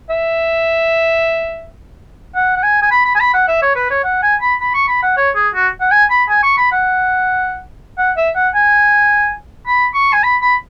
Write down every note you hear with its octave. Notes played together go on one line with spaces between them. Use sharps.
E5
F#5
F#5
G#5
G#5
B5
B5
G#5
B5
F#5
E5
C#5
B4
C#5
F#5
G#5
B5
B5
C#6
B5
F#5
C#5
G#4
F#4
F#5
G#5
B5
G#5
C#6
B5
F#5
F#5
E5
F#5
G#5
B5
C#6
G#5
B5
B5